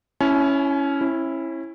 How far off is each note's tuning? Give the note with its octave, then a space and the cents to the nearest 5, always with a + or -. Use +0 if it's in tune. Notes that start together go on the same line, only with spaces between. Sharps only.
C#4 +0 E4 +0 G#5 +40
C#4 -35 E4 +0